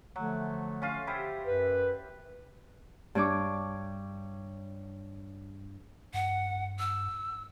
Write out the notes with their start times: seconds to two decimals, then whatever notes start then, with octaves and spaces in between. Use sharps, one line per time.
0.16 D3 F3 F#3 A3
0.82 C#4 F4 F5
1.07 E4 G4 C5
1.45 F#2 B4
3.15 G2 D4 C#5 D6
6.14 G2 F#5
6.79 E6